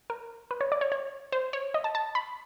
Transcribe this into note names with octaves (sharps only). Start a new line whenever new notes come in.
A#4
B4
C#5
D5
C#5
C#5
C5
C#5
D#5
A5
A5
B5